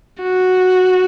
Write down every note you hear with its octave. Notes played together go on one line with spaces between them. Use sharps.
F#4